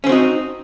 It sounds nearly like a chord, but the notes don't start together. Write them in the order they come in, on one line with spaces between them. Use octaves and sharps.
C#4 C4 F#4 D#4